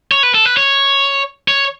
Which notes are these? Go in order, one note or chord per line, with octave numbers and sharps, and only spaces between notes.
C#5
B4
A4
B4
C#5
C#5